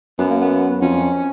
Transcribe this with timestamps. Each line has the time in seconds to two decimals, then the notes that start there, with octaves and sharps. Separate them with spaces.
0.19 F#2 B3
0.30 A#3
0.41 B3
0.70 B3
0.81 F2 C#4